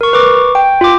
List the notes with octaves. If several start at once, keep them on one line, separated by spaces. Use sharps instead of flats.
A#4 C#6
B4 C#6 D6
G5
F4 D6